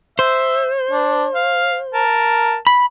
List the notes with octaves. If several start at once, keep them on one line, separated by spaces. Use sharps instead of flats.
C5 E5
D4
F5
A#4 A5
B5